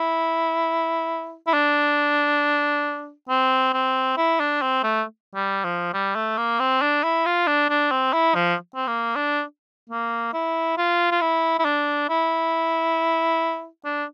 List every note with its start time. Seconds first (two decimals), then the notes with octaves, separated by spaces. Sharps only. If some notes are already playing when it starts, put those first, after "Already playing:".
Already playing: E4
1.47 E4
1.53 D4
3.29 C4
3.73 C4
4.17 E4
4.40 D4
4.62 C4
4.83 A3
5.35 G3
5.64 F3
5.93 G3
6.15 A3
6.37 A#3
6.60 C4
6.81 D4
7.03 E4
7.26 F4
7.47 D4
7.70 D4
7.91 C4
8.13 E4
8.35 F3
8.75 C4
8.87 A#3
9.15 D4
9.89 A#3
10.33 E4
10.77 F4
11.11 F4
11.21 E4
11.59 E4
11.65 D4
12.09 E4
13.85 D4